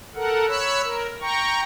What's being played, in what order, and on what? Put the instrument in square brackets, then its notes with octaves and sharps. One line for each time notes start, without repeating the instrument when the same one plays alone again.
[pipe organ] A4 A#4 F#5
C#5 B5 E6 F#6
A#4
G5 A#5 C#6